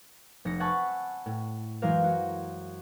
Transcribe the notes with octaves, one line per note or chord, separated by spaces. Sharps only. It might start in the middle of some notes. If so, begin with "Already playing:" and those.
F1 A#6 C#7
E5 F#5 G#5 A5 B5 C#6
A2
F#2 E3 G#3 A#4 C5 F5
F#4